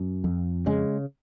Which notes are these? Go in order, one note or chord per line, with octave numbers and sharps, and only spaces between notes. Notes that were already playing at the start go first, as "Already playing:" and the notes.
Already playing: F#2
F2
C#3 G#3